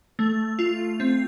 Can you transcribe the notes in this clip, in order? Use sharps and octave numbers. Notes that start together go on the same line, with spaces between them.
A3
F4
C4